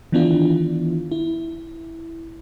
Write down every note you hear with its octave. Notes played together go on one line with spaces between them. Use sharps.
D#3 E3 B3 D4 E4 F4
E4